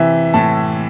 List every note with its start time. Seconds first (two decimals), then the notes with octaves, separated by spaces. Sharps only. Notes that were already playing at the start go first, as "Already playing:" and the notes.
Already playing: C3 E3 E5
0.34 A2 A5